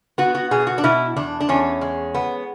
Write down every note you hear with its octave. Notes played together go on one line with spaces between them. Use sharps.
B3 F#4
F#4
B2 G#4
F#4
D4
B2 E4
E2 D4
D4
E2 C#4
G#3
B3